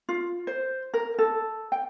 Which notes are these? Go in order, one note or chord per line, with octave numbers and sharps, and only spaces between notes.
F4
C5
A#4
A4
G5